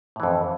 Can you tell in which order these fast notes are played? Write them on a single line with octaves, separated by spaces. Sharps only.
A2 E3 F2